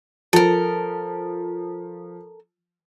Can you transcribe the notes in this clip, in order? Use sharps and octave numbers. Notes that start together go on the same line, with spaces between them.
F3 A4 A#4